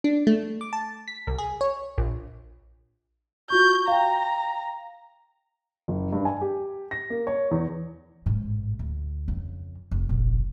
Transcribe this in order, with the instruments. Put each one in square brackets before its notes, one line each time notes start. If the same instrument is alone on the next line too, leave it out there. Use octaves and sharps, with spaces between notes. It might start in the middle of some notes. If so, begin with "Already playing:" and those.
[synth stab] D4
A3
D6
A5
B6
C2
G#4
C#5
A#1
[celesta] F4 F#4 C#6 [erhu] G6
[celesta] F5 G5 [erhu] A#5
[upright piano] F#1
G2
G#5
G4
A#6
A#3
C#5
E2
[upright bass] A1 G#2
D2
F2 C#3
F1
F1 A#1